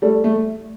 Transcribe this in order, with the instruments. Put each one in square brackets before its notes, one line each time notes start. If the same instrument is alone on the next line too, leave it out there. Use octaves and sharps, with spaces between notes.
[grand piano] G3 [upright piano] A3
[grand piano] A3